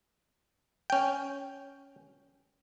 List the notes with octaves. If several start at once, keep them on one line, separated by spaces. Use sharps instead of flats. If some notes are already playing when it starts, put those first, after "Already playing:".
C#4 G5